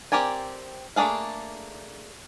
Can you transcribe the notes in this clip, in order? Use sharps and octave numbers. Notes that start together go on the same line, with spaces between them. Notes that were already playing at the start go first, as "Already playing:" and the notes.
C4 G4 A#4 D5 G#5
A3 A#3 D4 G#4 F5